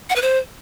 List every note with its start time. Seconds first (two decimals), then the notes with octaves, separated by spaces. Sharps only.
0.10 F#5
0.16 B4
0.22 C5